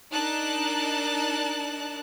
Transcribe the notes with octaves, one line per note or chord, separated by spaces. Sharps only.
D4 D#4 A#4 A5 F#6